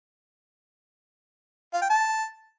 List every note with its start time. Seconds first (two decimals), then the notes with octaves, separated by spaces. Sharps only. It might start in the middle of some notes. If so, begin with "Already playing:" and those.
1.74 F4
1.82 G5
1.90 A5